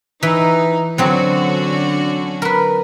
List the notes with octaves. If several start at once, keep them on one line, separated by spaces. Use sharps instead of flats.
E3 D#4
D3 F#3 C4 C#4 F#4
A#4 B4